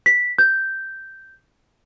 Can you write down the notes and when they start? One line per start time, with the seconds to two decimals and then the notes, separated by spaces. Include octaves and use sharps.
0.06 B6
0.38 G6